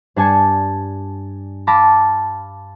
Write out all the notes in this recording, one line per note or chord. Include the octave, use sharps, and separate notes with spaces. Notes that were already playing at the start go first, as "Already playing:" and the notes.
G2 D4 G#5 A5 G#6 C#7
F5 A5 B5 D6 A#6 B6